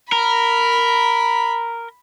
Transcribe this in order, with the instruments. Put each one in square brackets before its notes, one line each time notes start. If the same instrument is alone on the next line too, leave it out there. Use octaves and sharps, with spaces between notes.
[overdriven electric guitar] A#4 [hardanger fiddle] B5